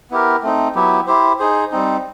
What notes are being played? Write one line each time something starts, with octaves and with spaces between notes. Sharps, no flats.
B3 E4 G4 A#4
A3 C4 D#4
F#3 B3 E4 G4
E4 G4 C5
D#4 G#4 C5
G3 C4 D#4